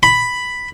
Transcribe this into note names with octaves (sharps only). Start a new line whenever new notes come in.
B5